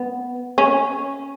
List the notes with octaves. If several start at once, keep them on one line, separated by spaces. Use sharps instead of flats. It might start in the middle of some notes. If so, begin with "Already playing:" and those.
Already playing: B3
C#4